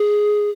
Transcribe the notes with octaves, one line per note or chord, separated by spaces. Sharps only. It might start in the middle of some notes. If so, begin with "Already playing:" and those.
Already playing: G#4